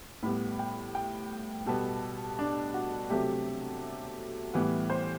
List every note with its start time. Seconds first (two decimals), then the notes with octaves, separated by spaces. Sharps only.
0.23 A2 G3 B3 B5
0.59 G5
0.95 G5
1.66 B2 G3 B3 A4
2.39 D4
2.74 F#4
3.10 C3 F#3 A3 G4
4.54 A2 E3 G3 B3
4.90 C5